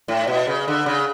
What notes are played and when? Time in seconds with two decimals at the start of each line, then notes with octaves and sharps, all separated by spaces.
0.08 A2
0.27 B2
0.47 C#3
0.68 D3
0.86 C#3